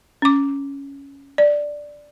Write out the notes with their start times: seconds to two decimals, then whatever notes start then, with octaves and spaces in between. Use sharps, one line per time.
0.22 C#4 D6
1.38 D5